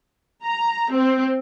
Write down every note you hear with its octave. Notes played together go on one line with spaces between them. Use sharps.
A#5
C4